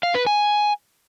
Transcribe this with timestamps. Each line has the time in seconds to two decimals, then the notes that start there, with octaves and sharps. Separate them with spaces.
0.03 F5
0.15 B4
0.27 G#5